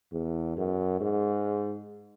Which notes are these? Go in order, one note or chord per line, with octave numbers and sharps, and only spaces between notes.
E2
F#2
G#2